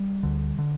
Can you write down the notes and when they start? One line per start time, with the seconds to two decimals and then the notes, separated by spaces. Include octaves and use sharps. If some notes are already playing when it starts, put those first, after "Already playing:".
Already playing: G3
0.23 D2 D3
0.58 D3